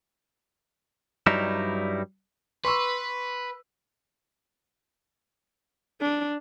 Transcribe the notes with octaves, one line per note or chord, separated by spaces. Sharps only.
G2 F#3 G3 D#4 E4
B4 C6 C#6 E6
D4